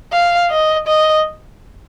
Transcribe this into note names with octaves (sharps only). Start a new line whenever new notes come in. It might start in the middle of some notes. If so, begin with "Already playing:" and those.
F5
D#5
D#5